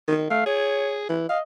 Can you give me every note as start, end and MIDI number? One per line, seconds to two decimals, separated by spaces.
0.08 0.29 51
0.30 0.43 57
0.30 0.45 77
0.46 1.07 68
0.46 1.01 73
1.09 1.25 52
1.29 1.42 75
1.29 1.38 77